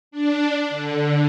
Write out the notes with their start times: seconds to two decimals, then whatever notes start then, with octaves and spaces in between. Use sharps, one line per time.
0.11 D4
0.69 D3